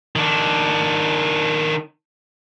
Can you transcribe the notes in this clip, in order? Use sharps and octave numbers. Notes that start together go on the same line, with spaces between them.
D#3 D4